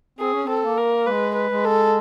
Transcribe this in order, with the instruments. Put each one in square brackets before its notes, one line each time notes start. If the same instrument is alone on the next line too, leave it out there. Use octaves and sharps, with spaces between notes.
[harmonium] C4 [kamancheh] G#4
[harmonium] C#4
[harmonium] C4 [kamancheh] A4
[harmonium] A#3
[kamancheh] A#4
[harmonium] G#3 [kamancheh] B4
[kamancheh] B4
[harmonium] G#3
[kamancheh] A4